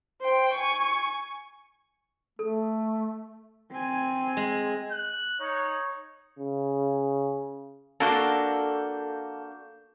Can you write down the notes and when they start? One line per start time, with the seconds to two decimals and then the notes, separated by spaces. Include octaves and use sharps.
0.21 C5 G5
0.53 G#5 C#6
2.39 A3 A4
3.71 C4 G#5
4.37 G#3
4.91 F#6
5.40 D#4 C#5
6.39 C#3
8.00 A#3 D4 F#4 A4 F5 G6